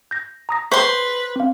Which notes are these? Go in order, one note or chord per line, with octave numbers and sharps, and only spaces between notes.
G6 A#6
A#5 D#6 A#6
B4 C5 C6 C#6
C4 F5